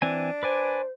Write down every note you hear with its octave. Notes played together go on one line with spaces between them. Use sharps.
E3 C4 D4 G#5
B4 C5 D5 G#5